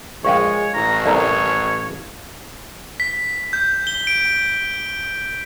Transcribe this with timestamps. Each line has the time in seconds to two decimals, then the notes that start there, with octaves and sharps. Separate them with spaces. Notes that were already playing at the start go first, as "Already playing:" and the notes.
0.25 A#1 G#3 C#5 F5 G5 C#6
0.74 A1 A#5
1.06 C2 A3 A#4 C#5
3.00 B6
3.53 G6
3.87 G7
4.07 D7